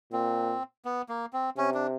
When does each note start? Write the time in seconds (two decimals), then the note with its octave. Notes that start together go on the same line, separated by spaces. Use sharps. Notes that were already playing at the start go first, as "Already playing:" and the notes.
0.12 A#2 C4
0.85 B3
1.09 A#3
1.33 C4
1.56 C3 C#4
1.74 D4